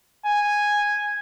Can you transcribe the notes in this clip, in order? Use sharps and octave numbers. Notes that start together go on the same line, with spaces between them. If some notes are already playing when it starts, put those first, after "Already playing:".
G#5